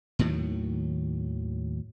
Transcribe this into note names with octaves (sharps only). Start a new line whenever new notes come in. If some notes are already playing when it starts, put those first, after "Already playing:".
D#2 A2 D#3 F#3